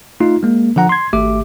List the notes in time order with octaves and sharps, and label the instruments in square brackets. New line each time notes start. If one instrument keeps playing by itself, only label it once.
[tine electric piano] A3 D#4 F4
G#3 A#3
D3 F3 F#5 A#5
C6 G#6
G#1 A3 G4 E5 D6